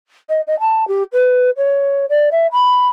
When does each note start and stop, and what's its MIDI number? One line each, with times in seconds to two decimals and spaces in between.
0.29 0.41 75
0.47 0.59 75
0.60 0.87 81
0.88 1.03 67
1.13 1.50 71
1.57 2.06 73
2.09 2.29 74
2.31 2.47 76
2.52 2.88 83